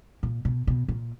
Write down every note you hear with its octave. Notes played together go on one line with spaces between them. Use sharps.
A#2
B2
B2
A#2